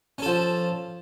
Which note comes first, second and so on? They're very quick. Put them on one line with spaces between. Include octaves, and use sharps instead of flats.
C#4 A4 F3